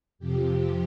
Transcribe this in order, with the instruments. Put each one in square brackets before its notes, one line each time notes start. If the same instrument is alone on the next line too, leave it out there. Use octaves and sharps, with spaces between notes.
[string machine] F2 C3 F3 G4